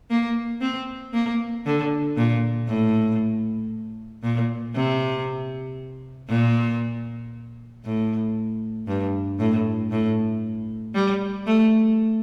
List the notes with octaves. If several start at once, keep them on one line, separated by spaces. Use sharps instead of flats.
A#3
C4
A#3
D3
A#2
A2
A#2
C3
A#2
A2
G2
A2
A2
G3
A3